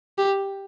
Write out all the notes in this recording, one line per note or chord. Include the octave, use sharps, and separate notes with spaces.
G4